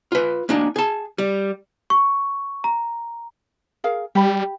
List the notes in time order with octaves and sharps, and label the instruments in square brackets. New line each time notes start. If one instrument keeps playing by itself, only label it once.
[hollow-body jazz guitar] F4 B4
A#3 D4 D#4
G#4 A5
G3
[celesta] C#6
A#5
[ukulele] G#4 A#4 F5
[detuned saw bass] G3 [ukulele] G4 B5